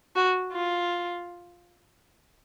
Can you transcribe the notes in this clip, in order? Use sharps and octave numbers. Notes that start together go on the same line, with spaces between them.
F#4
F4